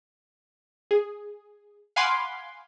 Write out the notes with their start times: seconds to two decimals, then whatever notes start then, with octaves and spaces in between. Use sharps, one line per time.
0.91 G#4
1.96 F5 F#5 G#5 B5 C6 D6